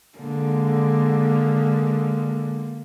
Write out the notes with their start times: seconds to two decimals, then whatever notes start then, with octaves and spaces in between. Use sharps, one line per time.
0.19 D3 G#3 A#3